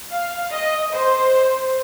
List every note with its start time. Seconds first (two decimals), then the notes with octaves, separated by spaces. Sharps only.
0.11 F5
0.52 D#5
0.92 C5